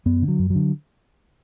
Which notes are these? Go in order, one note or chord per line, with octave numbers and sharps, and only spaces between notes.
F#2 B3
D3
F#3
F#2
D3 F#3